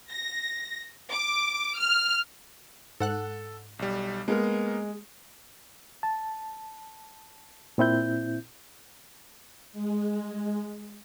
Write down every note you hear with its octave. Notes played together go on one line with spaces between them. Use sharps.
A#6
D6
F6
G#2 A4 F#5 F#6
B1 G3
G#3 A#3 B3 A#4
A5
A#2 C4 E4 G6
G#3